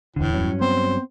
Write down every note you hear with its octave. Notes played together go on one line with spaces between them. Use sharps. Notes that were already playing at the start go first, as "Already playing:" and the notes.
D1 E2 A2 D3
G2 F#3 C#4
B3 C4 C5